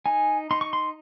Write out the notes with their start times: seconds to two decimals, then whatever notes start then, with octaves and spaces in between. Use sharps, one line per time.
0.06 D#4 G#5
0.51 D#4 C6
0.61 C#6
0.73 C6